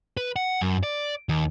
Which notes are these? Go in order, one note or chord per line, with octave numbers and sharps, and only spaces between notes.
B4
F#5
F#2
D5
D#2